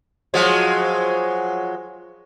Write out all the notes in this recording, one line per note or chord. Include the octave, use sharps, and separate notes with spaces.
F3 F#3 G#3